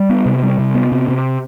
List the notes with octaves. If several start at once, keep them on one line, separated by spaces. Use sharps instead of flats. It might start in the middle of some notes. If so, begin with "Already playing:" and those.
Already playing: G3
B3
C3
G3
C3
B3
C3
C3